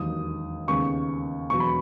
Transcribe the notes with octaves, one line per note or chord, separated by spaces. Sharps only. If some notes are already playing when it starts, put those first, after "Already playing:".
Already playing: E1 D#2 D#3 F#3 D#6
D#2 C#3 G#3 B3 C#6
E1 E2 B2 F#3 C#6
B5